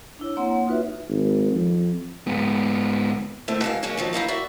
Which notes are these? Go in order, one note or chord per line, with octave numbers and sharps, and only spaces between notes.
D4 E4 C#5
A#3 C4 C#5 F#5 C6
A#3
D#4 F4 F#4 B4 E5
G#1
F2
G#2 B3
D2 A3 C4 E4
B2 G#3 F5
C#3 F#3 G#3 A#3 C#4
D#3 F3 F#3
D#4 E4 D#5 F5
F#4 D5 E5